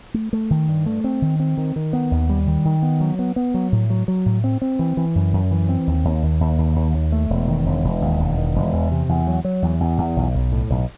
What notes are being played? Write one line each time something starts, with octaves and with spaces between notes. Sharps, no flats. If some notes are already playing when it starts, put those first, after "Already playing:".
A3
A3
D#3
G2
A3
C4
D#3
C4
D#3
D#3
B3
D#2
G3
D#3
D#3
B3
F#3
B3
B3
F#3
A2
F#3
F#3
A2
C4
C4
E3
E3
F#2
F#2
E3
C4
D#2
D#2
D#2
D#2
D#2
D#2
D#2
A3
E1
D#3
E1
E1
D#2
E1
D#3
E1
E2
C3
E2
F#3
F#3
E2
E2
E2
B1
B1
A2
B1